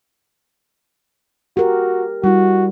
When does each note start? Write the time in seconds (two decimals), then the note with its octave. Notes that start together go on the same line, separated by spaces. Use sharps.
1.57 F#4 G4 A#4
2.24 G3 E4 F#4